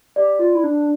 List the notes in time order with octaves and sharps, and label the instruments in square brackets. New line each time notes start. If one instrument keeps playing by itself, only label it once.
[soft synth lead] G4 [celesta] D5
[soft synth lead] F4
E4
D4